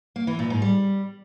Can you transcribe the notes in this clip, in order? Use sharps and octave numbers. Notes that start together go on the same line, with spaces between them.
A#3
E3
A#2
G#2
G3